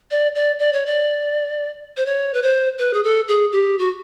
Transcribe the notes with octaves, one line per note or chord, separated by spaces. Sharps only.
D5
D5
D5
C#5
D5
C5
C#5
B4
C5
B4
G#4
A4
G#4
G4
F#4